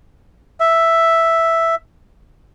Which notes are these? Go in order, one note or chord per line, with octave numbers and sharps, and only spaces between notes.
E5